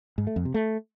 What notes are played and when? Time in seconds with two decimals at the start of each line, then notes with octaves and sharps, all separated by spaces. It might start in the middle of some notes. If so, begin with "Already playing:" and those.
0.18 G#2
0.27 A3
0.36 F2
0.45 C3
0.54 A3